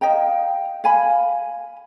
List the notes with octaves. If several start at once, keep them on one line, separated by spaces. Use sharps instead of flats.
D#5 F5 G5 A#5
F5 G#5 B5